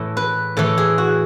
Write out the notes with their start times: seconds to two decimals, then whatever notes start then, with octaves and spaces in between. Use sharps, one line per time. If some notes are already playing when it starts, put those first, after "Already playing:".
Already playing: A2 E3 A4
0.17 B4
0.57 A2 E3 A4
0.78 G#4
0.98 F#4